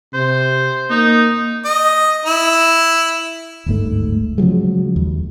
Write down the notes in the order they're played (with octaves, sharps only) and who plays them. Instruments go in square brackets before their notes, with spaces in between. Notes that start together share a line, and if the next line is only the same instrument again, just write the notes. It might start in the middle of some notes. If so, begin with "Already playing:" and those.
[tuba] C3 [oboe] C5
[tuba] A#3 [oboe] D#4
[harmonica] D#5
E4
[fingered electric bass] D1 G1 G#2 A3
C#3 F3 F#3 G#3
D#2